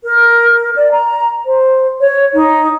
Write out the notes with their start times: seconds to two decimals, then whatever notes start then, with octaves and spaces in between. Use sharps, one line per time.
0.04 A#4
0.75 D5
0.91 A#5
1.46 C5
2.01 C#5
2.34 D#4